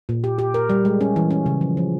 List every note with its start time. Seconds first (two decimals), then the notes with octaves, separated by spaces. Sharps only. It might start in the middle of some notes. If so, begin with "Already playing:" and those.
0.09 A#2
0.24 G4
0.39 G4
0.54 A#4
0.70 G3
0.85 G#3
1.01 C#4
1.16 E3
1.31 C#4
1.46 C#3
1.61 F3
1.77 F3